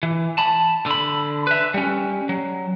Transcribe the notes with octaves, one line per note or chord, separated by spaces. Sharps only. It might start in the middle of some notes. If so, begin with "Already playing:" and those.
E3
A5 B5
D3 B5
B4 E5
G3 C#4
F#3